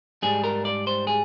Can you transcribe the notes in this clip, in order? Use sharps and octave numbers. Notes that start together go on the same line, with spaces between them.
G#2 G3 D4 G#4
A#4
D5
C5
G#4